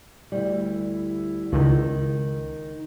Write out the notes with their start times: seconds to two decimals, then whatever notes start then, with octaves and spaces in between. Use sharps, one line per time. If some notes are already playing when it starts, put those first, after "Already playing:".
0.32 D2 G3 E4
1.52 C#2 D#3